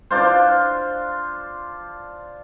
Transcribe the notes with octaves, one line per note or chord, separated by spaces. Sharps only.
D4 F4 C5